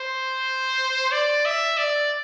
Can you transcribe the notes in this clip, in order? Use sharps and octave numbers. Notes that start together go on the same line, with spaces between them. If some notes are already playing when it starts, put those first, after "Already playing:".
Already playing: C5
D5
E5
D5